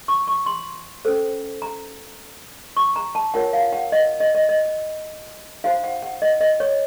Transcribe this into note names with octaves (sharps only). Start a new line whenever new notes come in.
C#6
C#6
C6
C#4 A4 C5
A#5
C#6
A#5
A5
F4 A#4 C#5 F#5
F5
F#5
D#5
D#5
D#5
D#5
D#4 F#4 C5 F5
F#5
F#5
D#5
D#5
C#5